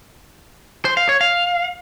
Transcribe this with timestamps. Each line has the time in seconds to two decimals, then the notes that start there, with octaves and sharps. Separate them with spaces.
0.85 C5
0.97 F5
1.09 C#5
1.21 F5